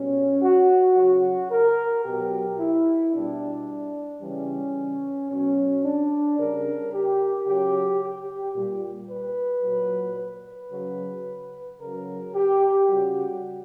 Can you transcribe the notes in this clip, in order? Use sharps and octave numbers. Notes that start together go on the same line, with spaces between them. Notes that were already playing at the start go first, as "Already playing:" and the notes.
Already playing: B2 G3 C#4
F#4
C#3 F#3 F#4
A#4
B2 F#3 G4
E4
B2 G3 D4
C#3 E3 G3 C#4
B2 F#3 C#4
D4
C#3 G3 A#4
G4
C#3 F#3 G4
G4
A#2 G3
B4
A#2 F#3
B4
C#3 F#3
C#3 F#3 A#4
G4
C#3 G3 F#4